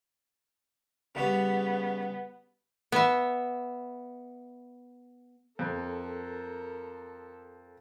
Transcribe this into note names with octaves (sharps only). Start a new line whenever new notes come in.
C#3 G3 B3 C#4
B3 E5
F2 A4 A#4